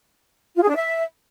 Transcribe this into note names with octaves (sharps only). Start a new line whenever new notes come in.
F4
G#4
D4
E5